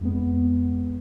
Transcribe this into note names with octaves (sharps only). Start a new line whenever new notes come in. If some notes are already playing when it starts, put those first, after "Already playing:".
F2 G#3 B3